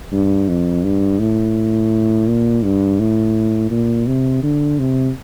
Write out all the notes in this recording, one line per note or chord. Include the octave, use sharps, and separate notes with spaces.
G2
F2
G2
A2
A#2
G2
A2
A#2
C3
D3
C3